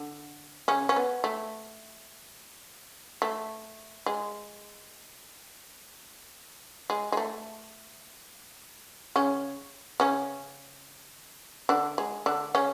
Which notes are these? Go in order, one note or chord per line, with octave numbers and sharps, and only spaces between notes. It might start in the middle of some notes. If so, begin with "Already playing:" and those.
Already playing: D3
C#3 C#4
C#4
B3
A3
A3
G#3
G#3
G#3
A3
C#3 C#4
C#3 C#4
D3 D4
G#3
D3 D4
C#3 C#4